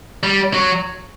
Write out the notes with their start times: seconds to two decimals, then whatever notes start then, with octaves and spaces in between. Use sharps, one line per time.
0.23 G3
0.54 F#3